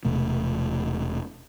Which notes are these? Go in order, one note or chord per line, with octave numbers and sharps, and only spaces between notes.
E1 C3 A3